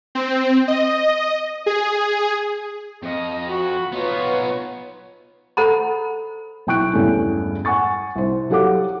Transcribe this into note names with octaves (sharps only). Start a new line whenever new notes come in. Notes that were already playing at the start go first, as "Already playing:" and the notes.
C4
D#5
G#4
F2 D#5
F#4 B5
B3 D#4 F4 B4 C#5
A4 C5 F#5 A#5 B5
B1 E4 G5 C#6 F#6 D7
E2 G2 G#3 A3 C#4
F#5 G#5 C#6 A6
C2 C5
F#3 G4 A4 F5 F#5 D6